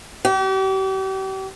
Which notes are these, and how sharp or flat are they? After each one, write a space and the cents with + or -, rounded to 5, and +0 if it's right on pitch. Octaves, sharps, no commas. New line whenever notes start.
G4 -40